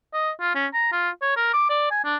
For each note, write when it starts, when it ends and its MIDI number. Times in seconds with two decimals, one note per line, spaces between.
0.13 0.31 75
0.40 0.55 65
0.55 0.67 61
0.74 0.90 82
0.92 1.10 65
1.21 1.33 73
1.37 1.49 70
1.53 1.69 86
1.70 1.87 74
1.91 2.04 80
2.04 2.16 62